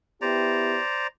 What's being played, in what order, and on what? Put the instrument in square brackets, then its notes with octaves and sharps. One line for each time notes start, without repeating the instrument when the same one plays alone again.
[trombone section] B3 E4 G4 [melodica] C5 D5 A#5